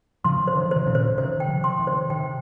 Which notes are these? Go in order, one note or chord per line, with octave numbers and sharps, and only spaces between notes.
C#3 F3 C6
C5
D#3
F3
C3 D#3 C5
A#2 C#3
C5
C3 D#3 C5
G5
C#3 F3
C6
C3 D#3
C5
C3 D#3 G5